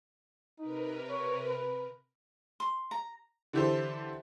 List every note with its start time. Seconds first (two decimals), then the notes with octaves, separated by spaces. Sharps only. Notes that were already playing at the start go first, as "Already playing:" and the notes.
0.59 C3 D#4 A#4 B4
1.09 C#5
1.47 B4
2.60 C6
2.91 A#5
3.53 D3 E3 E4 G4 A4 C5